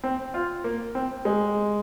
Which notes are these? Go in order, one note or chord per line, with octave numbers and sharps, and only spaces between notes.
C4
F4
A#3
C4
G#3